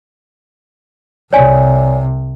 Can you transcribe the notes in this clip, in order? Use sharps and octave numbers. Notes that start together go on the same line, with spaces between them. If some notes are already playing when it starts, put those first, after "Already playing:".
C2 C3 C#5 D5 G#5